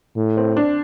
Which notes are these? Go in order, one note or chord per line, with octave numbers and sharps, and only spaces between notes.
A2
C4
D4